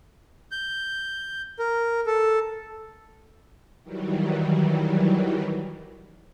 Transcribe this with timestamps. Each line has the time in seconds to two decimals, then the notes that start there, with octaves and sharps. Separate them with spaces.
0.51 G6
1.59 A#4
2.06 A4
3.83 D#3 E3 F#3 G3